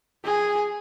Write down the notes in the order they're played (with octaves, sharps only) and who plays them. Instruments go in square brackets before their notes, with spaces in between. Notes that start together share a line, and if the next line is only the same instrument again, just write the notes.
[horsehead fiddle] G#4